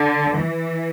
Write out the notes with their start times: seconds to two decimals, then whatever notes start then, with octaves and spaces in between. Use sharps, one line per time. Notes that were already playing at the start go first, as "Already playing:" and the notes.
Already playing: D3
0.36 E3